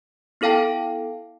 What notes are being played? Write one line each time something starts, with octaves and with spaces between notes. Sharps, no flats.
B3 E4 A4 F5 G5 A5